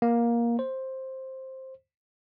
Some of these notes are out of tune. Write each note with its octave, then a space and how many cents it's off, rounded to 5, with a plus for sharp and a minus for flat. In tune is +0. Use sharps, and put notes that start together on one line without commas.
A#3 +15
C5 +10